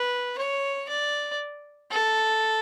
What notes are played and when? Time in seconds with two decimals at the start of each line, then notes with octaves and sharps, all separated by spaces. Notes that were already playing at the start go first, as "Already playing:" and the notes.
Already playing: B4
0.38 C#5
0.89 D5
1.90 A4